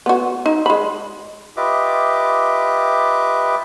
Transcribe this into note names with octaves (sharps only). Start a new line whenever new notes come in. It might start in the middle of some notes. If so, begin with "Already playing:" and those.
B3 F#4
D#4
G#3 B5
F4 G4 B4 D#5 E5 D6